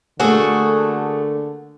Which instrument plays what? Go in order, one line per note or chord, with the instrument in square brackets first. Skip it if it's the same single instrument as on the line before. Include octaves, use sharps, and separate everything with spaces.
[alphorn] D3 [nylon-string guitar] A3 A#3 [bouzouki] F#4 G#4 A4